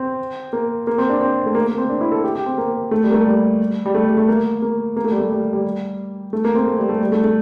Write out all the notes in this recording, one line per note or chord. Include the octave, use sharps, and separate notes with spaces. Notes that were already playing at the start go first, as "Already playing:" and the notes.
Already playing: C4
A#3
A#3
C4
D4
C4
A3
A#3
A#3
C4
D4
E4
A4
G4
G4
C4
A#3
A3
G3
A#3
A3
G3
G3
A3
G3
A3
A#3
A#3
A#3
A3
G3
A3
G3
G3
A3
A#3
C4
A3
G3
A3
G3
A3
A3